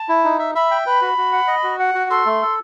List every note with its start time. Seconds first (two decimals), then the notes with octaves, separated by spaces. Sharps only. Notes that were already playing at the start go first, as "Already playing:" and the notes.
Already playing: A5
0.09 E4
0.24 D#4
0.39 E5
0.55 E5 B5
0.71 G5
0.86 B4 B5
1.01 F#4
1.18 F#4
1.33 F#5
1.47 D#5
1.64 F#4
1.80 F#5
1.95 F#4
2.10 A4 C6
2.26 A3
2.42 A4